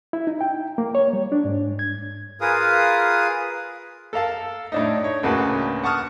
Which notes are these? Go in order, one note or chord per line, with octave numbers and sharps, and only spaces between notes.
E4
D#4
G5
A#3
C#5
G3
D4
G#2
G#6
F4 G#4 A#4 B4 F5 D#6
A4 A#4 F5 A5
A2 D4 D#4
C#5
D2 A2 C#3 A#3 F#4 B4
F#5 A5 C#6 D#6 F6